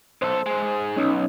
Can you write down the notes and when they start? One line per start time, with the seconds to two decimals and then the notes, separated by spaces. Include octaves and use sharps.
0.22 B1 A4 C5
0.46 G#2 G#3
0.97 B1 C#4 D#4